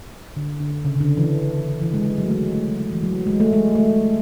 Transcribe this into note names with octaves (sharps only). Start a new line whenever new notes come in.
D3
D3
C#3
C#3
D3
E3
E3
G#3
G#3
F#3
A3
G#3
A3
E3
F#3
G#3
A3
G#3
A3